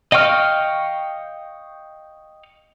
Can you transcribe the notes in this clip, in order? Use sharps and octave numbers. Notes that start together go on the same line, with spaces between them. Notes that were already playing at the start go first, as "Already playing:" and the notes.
D#5 F5 G5 C#6 F6